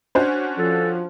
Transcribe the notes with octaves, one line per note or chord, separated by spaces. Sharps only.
C#4 D4 F#4 C5
F3 A4